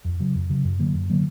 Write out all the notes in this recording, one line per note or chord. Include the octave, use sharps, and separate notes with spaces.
F2
C#3 F#3
F2
C#3 F#3
F#2
D3 F#3 A#3
F#2
D3 F#3 A#3